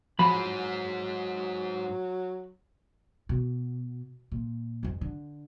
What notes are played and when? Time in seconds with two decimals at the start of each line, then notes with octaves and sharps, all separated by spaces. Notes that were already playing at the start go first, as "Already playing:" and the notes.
0.19 G#2 F3 F#3 G#3 B5
3.29 B2
4.32 A#2
4.83 F2 G#2
5.01 D3